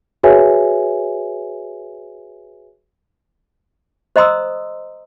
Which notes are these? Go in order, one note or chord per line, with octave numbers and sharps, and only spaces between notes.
F#4 G#4 B4 C#5 E5 G#5
C5 D#5 A#5 C6 D#6 E6